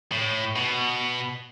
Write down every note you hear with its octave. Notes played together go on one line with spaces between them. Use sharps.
A2
B2